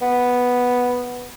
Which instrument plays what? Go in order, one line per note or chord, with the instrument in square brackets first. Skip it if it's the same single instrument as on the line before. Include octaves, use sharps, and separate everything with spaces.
[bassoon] B3